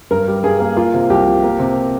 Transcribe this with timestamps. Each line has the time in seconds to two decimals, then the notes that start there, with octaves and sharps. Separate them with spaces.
0.11 G2 A#4
0.28 G3
0.43 G2 G#4
0.60 A#3
0.76 A#3 F4
0.93 C3
1.10 C2 G4
1.26 F3
1.43 A#3
1.59 C3